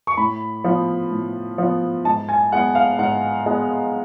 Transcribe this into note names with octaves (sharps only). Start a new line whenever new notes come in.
C#6
A2 B5
F3 B3
A2
F3 B3
G#2 A5
G#5
G#3 B3 F#5
F5
G#2 F#5
G#3 B3